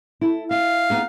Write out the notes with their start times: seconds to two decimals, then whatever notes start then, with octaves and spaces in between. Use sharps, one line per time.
0.21 E4 A4
0.51 E5 F5
0.90 B3 D#4 G#4